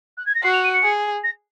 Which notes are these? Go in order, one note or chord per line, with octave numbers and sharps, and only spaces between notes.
F#6
G#6
A#6
F#4 C7
F7
D#7
C#7
G#4
A#6